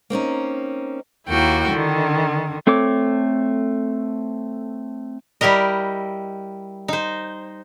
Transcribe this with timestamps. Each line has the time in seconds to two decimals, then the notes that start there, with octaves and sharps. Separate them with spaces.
0.10 A#3 C4 C#4 D#4
1.27 D#2 A#3 E4 F#4 G5
1.70 D3 D#3
2.67 A3 C4 A4 C#5 D6
5.41 G3 E4 G4 A#4 D#5
6.88 D#4 C5